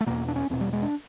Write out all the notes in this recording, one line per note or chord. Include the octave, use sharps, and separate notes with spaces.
A3
E2 B2 A#3
D4
C#4
E2 B2 C4
G3
G#3
D4